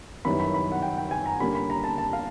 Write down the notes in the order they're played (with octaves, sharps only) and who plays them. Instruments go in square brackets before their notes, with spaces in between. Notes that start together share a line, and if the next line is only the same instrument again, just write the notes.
[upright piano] F#2 D#3 G3 B3 E4 B5
B5
B5
F#5
G5
G5
G#5
A#5
D3 G3 A#3 C#4 B5
B5
A#5
A5
A5
F5